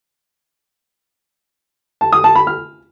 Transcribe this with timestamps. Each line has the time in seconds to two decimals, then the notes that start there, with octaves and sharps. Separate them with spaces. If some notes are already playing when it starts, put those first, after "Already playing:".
2.01 A5
2.12 D#6
2.24 A5
2.35 B5
2.47 F6